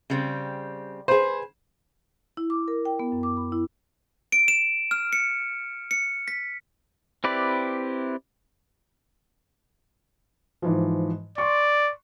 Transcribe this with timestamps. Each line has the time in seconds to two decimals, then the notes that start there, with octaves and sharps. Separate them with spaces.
0.10 C#3 G3 C4
1.08 G#4 B4 C5
2.37 E4
2.50 D6
2.68 A#4
2.85 G5
3.00 B3
3.12 F#2
3.23 D6
3.37 B5
3.52 E4
4.32 D7
4.48 E7
4.91 F6
5.13 C#7
5.91 C#7
6.28 B6
7.24 C4 E4 G4 B4 D5
10.62 G#2 E3 F3
11.38 D5 C6 C#6